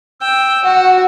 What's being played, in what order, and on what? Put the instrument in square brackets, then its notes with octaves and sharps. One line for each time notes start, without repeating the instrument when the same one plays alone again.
[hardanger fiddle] G5 [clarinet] E6
[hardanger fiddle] F#4 [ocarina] F#5